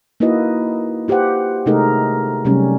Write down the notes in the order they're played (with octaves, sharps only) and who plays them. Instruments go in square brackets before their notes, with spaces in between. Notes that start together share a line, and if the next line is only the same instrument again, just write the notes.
[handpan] A#3 D#4 E4 F#4 B4 D#5
F4 G4 B4 C5 F#5
C3 G#3 A3 D#4 G#4 A#4
C3 F#3 G3 A3 C#4